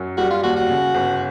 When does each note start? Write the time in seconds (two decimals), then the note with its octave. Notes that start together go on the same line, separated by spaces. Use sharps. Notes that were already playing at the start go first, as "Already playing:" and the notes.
Already playing: F#2 F#3
0.17 G3 F#4
0.30 F4
0.43 D#2 F#4
0.56 F#4
0.69 C#3
0.95 G1